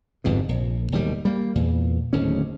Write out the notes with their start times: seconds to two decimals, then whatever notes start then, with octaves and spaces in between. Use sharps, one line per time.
0.24 G1 F2 G#2 B2
0.49 A#1
0.92 E1 D#2 G3
1.25 G3 A#3
1.55 E2 A#2
2.13 D1 D#2 A2 C#4